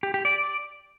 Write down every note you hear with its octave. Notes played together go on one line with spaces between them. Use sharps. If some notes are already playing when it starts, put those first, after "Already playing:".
G4
G4
D5